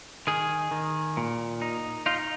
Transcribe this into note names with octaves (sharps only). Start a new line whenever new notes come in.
D#3 G#4
D#3
A#2
D#4
D#4 F4